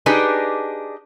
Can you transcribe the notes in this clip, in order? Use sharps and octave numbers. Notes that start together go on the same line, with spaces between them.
D4 D#4 G4 G#4 B4 D#5